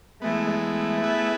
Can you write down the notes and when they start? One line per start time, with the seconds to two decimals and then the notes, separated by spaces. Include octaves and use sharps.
0.22 E3 G#3 A3 B3
0.62 A3
1.01 B3 E4 G#4 B4